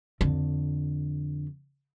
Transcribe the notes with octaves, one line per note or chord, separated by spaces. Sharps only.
F2 D3